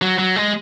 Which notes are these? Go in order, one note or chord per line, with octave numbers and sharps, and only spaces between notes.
F#3
F#3
G#3